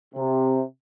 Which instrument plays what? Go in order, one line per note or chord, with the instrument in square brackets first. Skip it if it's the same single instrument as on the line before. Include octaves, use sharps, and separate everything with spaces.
[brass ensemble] C3